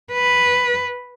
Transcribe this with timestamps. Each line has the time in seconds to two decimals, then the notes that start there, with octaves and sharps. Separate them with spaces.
0.13 B4